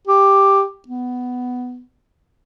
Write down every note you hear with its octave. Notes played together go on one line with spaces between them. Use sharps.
G4
B3